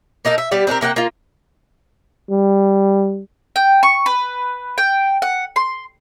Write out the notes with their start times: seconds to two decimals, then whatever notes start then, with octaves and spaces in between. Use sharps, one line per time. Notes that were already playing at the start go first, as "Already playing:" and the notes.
0.25 A#3 D#4 A4 A#4
0.38 E5
0.51 G3 B3 G4 D5
0.67 C4 D4 G4 A#4
0.81 C3 A#3 F#5 G5
0.96 A#3 F4
2.31 G3
3.56 G5
3.83 C#6
4.06 B4
4.78 G5
5.22 F#5
5.56 C6